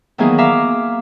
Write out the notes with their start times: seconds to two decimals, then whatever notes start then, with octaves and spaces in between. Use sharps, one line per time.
0.18 D#3 E3 F#3 A#3 B3 G#4
0.38 E5 F5 A#5 D6